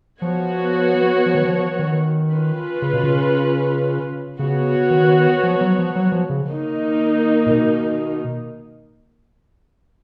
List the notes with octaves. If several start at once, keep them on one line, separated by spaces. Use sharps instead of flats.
F3 B3 F#4 C#5
F3
D#3
F3
D#3
C#4 F4 B4
C#3
B2
C#3
C#3 B3 F#4 C#5
D#3
F3
F#3
F3
F#3
F3
C#3
D#3 A#3 D#4
A#2
B2